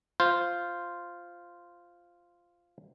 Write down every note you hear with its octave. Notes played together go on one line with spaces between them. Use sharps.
F4 C5